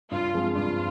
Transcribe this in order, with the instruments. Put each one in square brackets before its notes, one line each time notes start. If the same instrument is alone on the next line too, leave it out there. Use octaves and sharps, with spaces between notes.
[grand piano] G2 [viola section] F4
[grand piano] F3 G#3 C4
[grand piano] G2 [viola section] F4